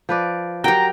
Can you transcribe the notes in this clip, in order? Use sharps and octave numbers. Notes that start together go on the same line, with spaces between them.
F3 B4 D5
F#3 G4 A#4 G5 A#5